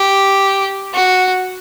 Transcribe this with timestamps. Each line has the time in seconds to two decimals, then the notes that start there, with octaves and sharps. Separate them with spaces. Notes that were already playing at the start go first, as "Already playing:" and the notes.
Already playing: G4
0.94 F#4